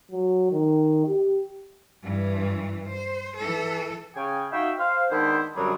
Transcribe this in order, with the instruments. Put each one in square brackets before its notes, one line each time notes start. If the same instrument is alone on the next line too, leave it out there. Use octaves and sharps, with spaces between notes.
[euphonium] F#3
D#3
G4
[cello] G2 E3
C5
E3 A4
[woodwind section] C#3 G5 G#5
D#4 F#4 E5 F5 G5
C5 F5
D#3 G#3 B3 D4 E4 C5
F#2 D3 F#3 G3 C4 G#4